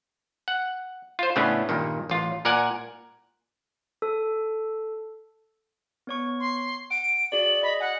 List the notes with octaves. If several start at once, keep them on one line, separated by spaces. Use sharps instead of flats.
F#5
F4 C5
A2 C#3 A3 B3 C#4 D4
G2 A#2 D#3
A1 F4
A#2 A#4 D5 F#5 G#5
A4
B3 C#5 C#6
C6
F#5 D7
F#4 G#4 D5 F#7
D#5 B5
F#5 G#5